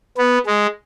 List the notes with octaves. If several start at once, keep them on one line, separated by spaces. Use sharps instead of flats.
B3
G#3